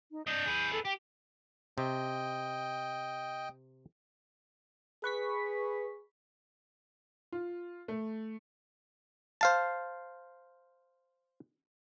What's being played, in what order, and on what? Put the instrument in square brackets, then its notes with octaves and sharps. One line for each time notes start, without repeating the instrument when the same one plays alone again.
[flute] D#4
[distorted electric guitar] D4 D#5 [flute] G6
[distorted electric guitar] G#4 B4
[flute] A4
[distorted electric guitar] G4 [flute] G5
[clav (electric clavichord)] C3 [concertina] D#5 G5
[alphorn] G#4 [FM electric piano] B4 C#6 B6
[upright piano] F4
A3
[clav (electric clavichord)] C5 F5 A5